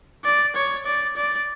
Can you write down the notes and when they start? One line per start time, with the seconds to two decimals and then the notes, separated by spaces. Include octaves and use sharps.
0.24 D5
0.56 C#5
0.86 D5
1.16 D5